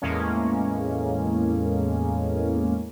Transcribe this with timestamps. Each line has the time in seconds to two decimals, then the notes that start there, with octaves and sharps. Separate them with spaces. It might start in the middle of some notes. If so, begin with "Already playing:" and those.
0.02 E2 A2 G#3 A#3 C#4